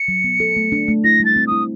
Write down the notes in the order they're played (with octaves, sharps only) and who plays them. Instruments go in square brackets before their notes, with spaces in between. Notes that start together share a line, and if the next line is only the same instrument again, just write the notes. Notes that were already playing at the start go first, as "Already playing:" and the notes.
Already playing: [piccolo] C#7
[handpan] F#3
B3
A4
A3
D4
A3
[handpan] E4 [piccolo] A#6
[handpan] G3
[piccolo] A6
[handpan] C4
[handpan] E4 [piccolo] D#6